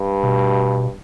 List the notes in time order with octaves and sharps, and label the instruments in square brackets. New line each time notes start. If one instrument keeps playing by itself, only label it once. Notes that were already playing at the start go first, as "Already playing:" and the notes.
Already playing: [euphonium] G2
[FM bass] B2